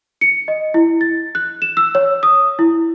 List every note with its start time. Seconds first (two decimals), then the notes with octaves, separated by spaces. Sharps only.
0.21 C#7
0.48 D#5
0.74 E4
1.01 A6
1.35 F#6
1.62 E7
1.77 E6
1.95 C#5
2.23 D#6
2.59 E4